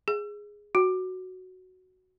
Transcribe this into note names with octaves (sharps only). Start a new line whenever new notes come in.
G#4
F#4